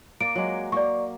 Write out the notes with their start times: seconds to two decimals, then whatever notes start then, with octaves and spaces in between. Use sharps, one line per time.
0.21 A#3 D5 D7
0.35 F#3 G#3
0.72 A#3 D5 C#6